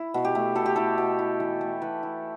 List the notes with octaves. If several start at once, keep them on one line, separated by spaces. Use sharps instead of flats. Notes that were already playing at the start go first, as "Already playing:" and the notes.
Already playing: E4
B2
G4
A3
B2 A4
G4
E4 A4
B2
E4
E3
A3
E3 B4
E4